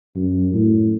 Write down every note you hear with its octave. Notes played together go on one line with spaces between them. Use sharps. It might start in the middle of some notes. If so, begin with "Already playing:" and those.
F#2
A2